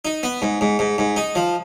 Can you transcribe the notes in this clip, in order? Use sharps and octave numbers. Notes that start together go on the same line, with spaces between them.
D#4
B3
G#2
G#2
G#2
G#2
D#4
F3